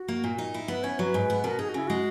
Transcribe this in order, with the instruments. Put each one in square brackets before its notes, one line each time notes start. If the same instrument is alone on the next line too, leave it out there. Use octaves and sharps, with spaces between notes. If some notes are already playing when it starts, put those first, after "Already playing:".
Already playing: [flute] F#4
[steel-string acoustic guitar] A#3
A#2
D#4
E4
[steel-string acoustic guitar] B3 [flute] B4
[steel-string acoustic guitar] C#4 [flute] C#5
[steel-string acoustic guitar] F#3 [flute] B4
[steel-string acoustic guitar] G#2
B3
[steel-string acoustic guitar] B2 [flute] A#4
[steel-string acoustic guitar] D#4 [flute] G#4
[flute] F#4
[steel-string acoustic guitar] C#3 [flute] E4
[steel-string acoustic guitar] G#3 [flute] F#4